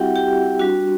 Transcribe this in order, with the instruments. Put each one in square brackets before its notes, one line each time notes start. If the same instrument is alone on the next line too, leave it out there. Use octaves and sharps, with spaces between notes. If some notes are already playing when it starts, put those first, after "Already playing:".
Already playing: [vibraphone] G3 C4 E4 F#4 G4 E5 F#5 G5
G4 G5
G3 D4 F#4